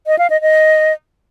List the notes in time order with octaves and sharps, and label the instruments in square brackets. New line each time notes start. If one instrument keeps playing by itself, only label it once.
[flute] D#5
F5
D#5
D#5